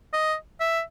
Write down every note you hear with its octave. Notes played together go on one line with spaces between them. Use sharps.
D#5
E5